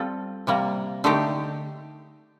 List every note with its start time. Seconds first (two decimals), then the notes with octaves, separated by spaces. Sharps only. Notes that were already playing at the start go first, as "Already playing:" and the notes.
Already playing: G3 C4 F4 A4
0.47 C3 G3 A#3
1.04 D3 A3 D#4 G4